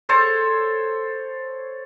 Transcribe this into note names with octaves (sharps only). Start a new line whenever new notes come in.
A4 C5 C#5 A5